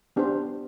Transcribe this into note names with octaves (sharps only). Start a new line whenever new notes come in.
B3 D4 G4 C5